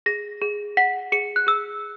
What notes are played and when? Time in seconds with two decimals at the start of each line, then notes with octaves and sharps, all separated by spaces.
0.06 G#4 A#6
0.41 G#4
0.77 F#5 B6
1.12 G#4 C#7
1.36 F#6
1.47 G#4 E6